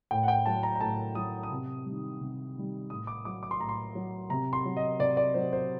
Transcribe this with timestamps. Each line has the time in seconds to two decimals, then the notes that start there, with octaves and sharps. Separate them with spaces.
0.11 A2 G5
0.23 F#5
0.28 G5
0.46 F#3 A5
0.63 A#5
0.75 A#5
0.81 A2 A5
1.15 F#3 D#6
1.43 D#6
1.51 C3
1.85 D#3 G3
2.21 C3
2.56 D#3 G3
2.90 A2 D#6
3.07 D6
3.25 F#3 D6
3.43 D6
3.51 C6
3.60 A2 A#5
3.69 C6
3.95 F#3
4.30 C3 A#5
4.53 C6
4.65 F#3
4.77 D#5
4.99 C3 D5
5.17 D5
5.34 F#3 C5
5.53 C5